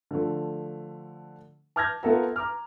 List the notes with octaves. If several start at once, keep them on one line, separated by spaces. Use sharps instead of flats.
D3 F3 A3
A5 D6 F6 G6 G#6 A#6
B3 F4 A4 A#4 E5 A#5
A#5 D6 F6